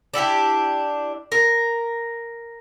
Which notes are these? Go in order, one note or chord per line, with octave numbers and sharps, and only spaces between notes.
D4 E4 F#4 G4
A#4